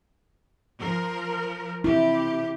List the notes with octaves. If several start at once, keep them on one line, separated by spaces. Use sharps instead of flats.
F3 A#4
C3 E4 G4